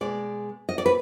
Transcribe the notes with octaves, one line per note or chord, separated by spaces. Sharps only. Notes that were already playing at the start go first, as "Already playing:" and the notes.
B2 G#3 D5
D#5
D5
B4